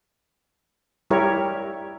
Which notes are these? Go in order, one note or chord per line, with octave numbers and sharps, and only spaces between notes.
G3 E4 G4 A#4 C#5